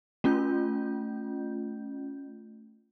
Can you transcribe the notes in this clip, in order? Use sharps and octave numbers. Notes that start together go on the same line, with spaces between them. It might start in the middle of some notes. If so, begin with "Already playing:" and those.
A3 C#4 F4 G6